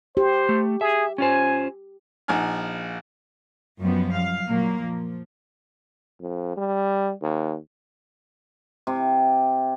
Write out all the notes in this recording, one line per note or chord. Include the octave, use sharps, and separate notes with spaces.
G4 C5
A3
G#4 E5
C#4 F4 C5 G#5
A#1 D#4 F#5 G#5 F6
F#2 F3 G3 B3
F5
A#2 F#3 A#3
F3
F2
G3
D#2
C3